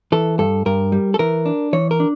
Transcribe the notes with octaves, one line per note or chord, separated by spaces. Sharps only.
E3 A4
G2 A4
G2 A#4
G3
A4
E3 A#4
D4
E3 C#5
A#4
D4